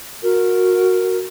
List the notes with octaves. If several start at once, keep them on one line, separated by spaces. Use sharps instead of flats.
F#4 A#4